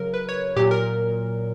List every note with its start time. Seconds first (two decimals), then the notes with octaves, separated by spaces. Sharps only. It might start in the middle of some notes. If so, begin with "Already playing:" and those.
Already playing: C#3 F#3 A#4
0.14 B4
0.29 C#5
0.56 A#2 G4
0.59 F#3
0.71 A#4